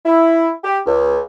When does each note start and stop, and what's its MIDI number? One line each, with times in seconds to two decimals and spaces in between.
0.05 0.49 64
0.63 0.77 67
0.86 1.18 37